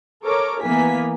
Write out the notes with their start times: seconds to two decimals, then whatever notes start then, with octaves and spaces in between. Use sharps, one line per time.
0.23 A4 A#4 C#5 D6
0.61 E3 A#3 B3 G#5 B6